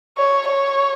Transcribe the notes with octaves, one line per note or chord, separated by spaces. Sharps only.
C#5
C#5